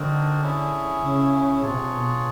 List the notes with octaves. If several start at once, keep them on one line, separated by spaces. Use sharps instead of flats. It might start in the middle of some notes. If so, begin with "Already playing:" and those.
Already playing: D3 C4 D#4 F#4 A#4
C#4 E4 G#4
C#3
C3 D4 F4 G#4 C#5
B2